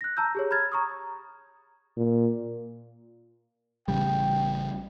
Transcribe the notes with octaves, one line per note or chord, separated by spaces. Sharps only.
F#6 A#6
A5 A#5 E6 G6
G4 G#4 C#5
B5 F6 G#6 A6
A#5 C#6 D#6
A#2
A1 C#3 G3 G5